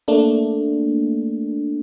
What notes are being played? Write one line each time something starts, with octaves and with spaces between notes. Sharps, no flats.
A3 A#3 D4